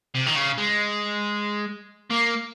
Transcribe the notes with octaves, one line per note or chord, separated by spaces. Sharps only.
C3
D#3
C#3
G#3
A#3